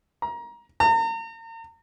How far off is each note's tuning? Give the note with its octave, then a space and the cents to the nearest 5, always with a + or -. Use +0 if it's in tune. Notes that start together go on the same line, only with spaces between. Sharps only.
A#5 +25
A#5 -40